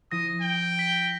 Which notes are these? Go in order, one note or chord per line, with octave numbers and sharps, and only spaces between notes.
F3 E4 D#6 A#6
G5 G7
B6 G7